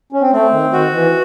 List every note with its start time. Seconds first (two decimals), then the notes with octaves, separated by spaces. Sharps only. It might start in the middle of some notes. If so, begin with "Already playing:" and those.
0.12 C#4
0.22 C4
0.32 A3 C4
0.52 D#3
0.73 D#3 F#4
0.93 E3